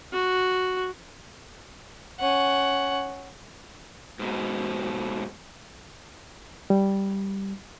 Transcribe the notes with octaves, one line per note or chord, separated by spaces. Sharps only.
F#4
C#4 F#5
G#2 B2
G3